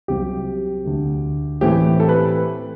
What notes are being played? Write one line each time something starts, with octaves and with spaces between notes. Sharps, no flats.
C2 C3 F#3 C4 G4
D2 D3 A3
A2 E3 A3 C4 G4
A4
B4